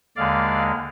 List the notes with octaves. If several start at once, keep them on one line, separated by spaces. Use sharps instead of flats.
D#2 D3 G#3 D5 F5